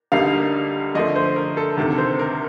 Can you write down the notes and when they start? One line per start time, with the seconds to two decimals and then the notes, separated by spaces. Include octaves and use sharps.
0.12 D2 D3 G3 A#3 D#4 F5
0.95 D3 F3 A3 D#5
1.16 C5
1.36 A#4
1.57 A4
1.77 D2 C3 D#3 A4
1.98 C5
2.19 A#4